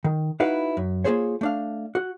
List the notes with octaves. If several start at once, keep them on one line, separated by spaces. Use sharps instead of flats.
D#3
D#4 E4 F#4 B4 F5 F#5
F#2
A#3 B3 F4 G#4 C5 C#5
A3 D4 F5
F#4